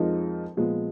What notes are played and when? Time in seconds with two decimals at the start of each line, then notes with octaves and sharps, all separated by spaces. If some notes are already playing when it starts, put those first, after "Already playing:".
Already playing: F2 F3 G#3 D#4 A#4
0.57 A#2 F3 G#3 B3